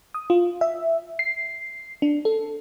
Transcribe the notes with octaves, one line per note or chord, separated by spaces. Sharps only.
D#6
F4
E5
C7
D4
A4